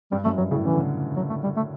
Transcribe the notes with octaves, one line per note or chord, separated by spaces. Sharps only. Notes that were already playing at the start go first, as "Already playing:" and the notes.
G2 G3
F#2 A3
G2 F#3
A2 C#3
C#3 E3
D3
C#3
F#3
A3
G3
A3